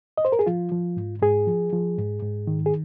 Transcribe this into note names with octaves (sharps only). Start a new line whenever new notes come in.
D#5
C5
A#4
G#4
F3 F4
F3
G#2
G#2 G#4
F3
F3
G#2
G#2
D#3
G#4